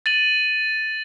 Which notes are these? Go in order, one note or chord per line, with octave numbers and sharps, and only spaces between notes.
A6 D#7 F#7